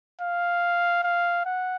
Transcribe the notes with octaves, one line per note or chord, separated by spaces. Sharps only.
F5
F5
F#5